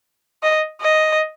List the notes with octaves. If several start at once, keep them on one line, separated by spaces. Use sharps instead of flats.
D#5
D#5